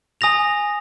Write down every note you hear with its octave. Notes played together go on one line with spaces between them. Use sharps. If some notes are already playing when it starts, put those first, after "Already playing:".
G#5 D#6 A#6 F7